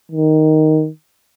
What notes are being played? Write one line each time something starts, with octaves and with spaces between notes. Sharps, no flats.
D#3